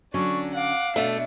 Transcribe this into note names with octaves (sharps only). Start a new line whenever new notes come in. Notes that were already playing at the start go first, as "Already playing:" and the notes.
D3 F#3 C#4 D4 C#6
F5 F#5 D6
B2 A3 D4 C#7